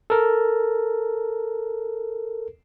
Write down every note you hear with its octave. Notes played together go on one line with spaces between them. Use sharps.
A4 A#4